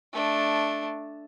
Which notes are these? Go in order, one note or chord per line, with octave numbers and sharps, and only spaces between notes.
A3 D4